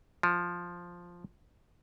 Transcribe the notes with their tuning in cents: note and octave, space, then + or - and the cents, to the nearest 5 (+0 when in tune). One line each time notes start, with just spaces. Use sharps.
F3 +5